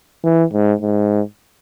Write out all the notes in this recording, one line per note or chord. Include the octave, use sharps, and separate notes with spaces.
E3
G#2
G#2